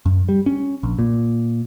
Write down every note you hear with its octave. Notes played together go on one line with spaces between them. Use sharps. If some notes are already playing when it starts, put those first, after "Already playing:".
F#2
G3
C#4
A#1
A#2